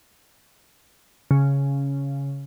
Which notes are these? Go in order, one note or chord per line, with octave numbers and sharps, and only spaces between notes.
C#3